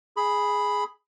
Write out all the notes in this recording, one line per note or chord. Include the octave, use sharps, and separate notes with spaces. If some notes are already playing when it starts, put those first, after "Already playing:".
G#4 B5